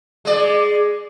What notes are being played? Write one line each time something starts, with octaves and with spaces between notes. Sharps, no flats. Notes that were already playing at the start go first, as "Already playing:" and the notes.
G#3 D5